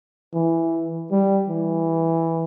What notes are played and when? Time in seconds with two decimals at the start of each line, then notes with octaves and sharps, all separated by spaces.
0.34 E3
1.12 G3
1.49 E3